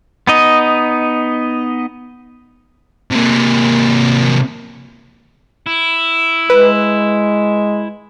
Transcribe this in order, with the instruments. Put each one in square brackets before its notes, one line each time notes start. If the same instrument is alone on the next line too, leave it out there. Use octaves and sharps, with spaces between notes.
[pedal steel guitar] B3 D#4 D#5
[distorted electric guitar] C3 A#3
E4
[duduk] G#3 [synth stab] B4